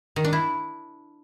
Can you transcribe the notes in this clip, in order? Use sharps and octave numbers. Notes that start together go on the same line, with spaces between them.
D#3
D4
E4